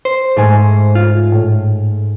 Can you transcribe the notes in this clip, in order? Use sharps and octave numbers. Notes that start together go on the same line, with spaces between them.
C5
G#2 A3 G#5
F4
A2